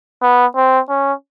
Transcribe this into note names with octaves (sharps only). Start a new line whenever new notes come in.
B3
C4
C#4